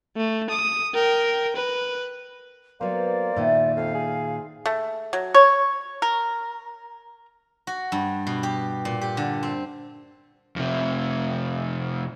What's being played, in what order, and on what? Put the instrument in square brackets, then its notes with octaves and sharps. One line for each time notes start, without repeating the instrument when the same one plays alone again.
[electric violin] A3
D#6
A#4 G5
B4
[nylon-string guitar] F#3 B3 [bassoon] A#3 [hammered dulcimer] C5 [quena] D5
[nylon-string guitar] A#2 D#3 [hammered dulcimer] E4
[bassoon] F2 [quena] F5
[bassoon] G#4
[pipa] A3
F#3
C#5
A#4
[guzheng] F#4
G2
B2
G4
A#2
G4
D3
C4
[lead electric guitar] F2 C3